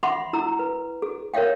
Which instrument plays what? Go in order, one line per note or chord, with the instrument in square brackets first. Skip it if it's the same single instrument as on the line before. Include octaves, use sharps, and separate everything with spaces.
[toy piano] E5 F#5 B5 C6 D6
E4 A#5 E6
B4
G#4
A#4 C#5 E5 F5 G5